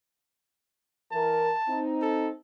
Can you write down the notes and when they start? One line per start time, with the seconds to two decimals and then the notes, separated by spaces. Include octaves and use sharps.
1.12 E3 A#4 A5
1.68 C4 D#4
2.02 A4